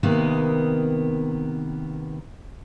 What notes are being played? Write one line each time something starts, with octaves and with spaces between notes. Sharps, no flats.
C3 D#3 A#3 B3